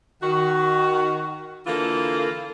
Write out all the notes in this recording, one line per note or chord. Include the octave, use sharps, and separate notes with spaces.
D#3 F#4
D3 E3 A#3 F4 A4